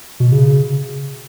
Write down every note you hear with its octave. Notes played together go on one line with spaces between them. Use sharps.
B2
C#3